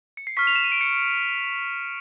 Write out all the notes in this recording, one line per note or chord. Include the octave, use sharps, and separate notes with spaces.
C#7
C7
C#6 F6 B6
F7
E7
D#7
D7
C#7